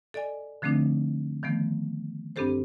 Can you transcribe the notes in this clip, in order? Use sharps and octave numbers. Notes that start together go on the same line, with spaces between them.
A4 D5 D#5 G#5
D3 F3 A3 C4 D4 D#4
D#3 F3 A3 B3
G2 C4 D4 G4 A4 C5